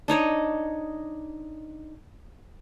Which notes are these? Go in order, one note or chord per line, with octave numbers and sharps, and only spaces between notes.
D4 D#4 C#5 D#5